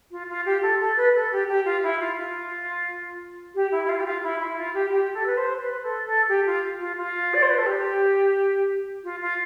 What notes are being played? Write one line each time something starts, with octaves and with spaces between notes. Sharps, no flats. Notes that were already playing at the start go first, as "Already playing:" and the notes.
F4
F4
G4
A4
A4
B4
A4
G4
G4
F4
E4
F4
F4
G4
E4
E4
F4
G4
F4
E4
E4
F4
G4
G4
A4
B4
C5
B4
A4
A4
G4
F4
F4
F4
D5
C5
B4
A4
G4
F4
F4